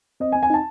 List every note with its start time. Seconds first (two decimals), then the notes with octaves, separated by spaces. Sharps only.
0.20 C4 D#5
0.32 G#5
0.35 C4
0.43 G#5
0.50 D#4 A5